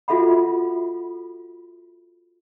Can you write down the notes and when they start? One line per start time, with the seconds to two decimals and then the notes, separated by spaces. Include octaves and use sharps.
0.08 F4 F#4 A4 E5 F#5 B5